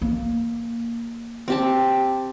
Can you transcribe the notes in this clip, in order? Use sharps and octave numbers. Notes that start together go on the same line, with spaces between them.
A#3
C4 G4 A5